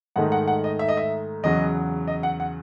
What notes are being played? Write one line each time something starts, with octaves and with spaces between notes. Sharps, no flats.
G#2 D#3 A3 D#4 F#5
F#5
F#5
D#5
E5
D#5
E5
E2 C#3 F#3 D#5
D#5
F#5
F#5